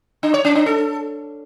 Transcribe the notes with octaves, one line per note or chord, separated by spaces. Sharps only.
D4
C#5
C#4
D4
A4